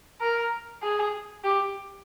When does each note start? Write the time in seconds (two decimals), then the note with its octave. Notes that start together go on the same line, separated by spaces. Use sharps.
0.21 A#4
0.83 G#4
1.44 G4